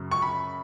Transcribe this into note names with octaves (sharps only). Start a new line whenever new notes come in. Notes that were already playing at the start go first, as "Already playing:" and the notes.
Already playing: F#2 C#3
C#6
B5